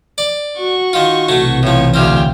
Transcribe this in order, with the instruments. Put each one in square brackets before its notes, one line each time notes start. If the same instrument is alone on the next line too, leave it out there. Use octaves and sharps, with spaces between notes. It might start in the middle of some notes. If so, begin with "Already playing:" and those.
[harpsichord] D5
[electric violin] F#4 C#6
[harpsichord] D#3 F4
[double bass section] B1 C3 E3 [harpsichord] F#3 A3
[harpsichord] A2 F3 [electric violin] C#5
[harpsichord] D2 C#3 C4 [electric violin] G5 F6